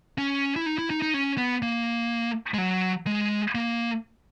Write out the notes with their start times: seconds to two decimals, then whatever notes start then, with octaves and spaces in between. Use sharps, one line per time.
0.18 C#4
0.56 E4
0.66 D#4
0.78 E4
0.90 D#4
1.02 D#4
1.14 C#4
1.38 B3
1.62 A#3
2.54 G#3
2.58 F#3
3.07 G#3
3.55 A#3